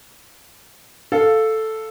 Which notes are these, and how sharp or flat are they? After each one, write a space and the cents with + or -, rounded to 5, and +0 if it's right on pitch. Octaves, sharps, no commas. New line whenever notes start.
A4 +0 F5 +0